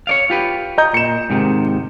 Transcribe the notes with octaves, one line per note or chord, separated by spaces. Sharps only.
C#5 D5 F5
F4 G4 B4
D#5 A#5 G6
A#2 C#7 E7
G#2 C3 D#3